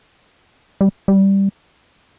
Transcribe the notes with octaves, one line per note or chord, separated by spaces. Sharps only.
G3
G3